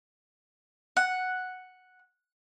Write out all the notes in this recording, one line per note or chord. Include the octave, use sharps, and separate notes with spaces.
F#5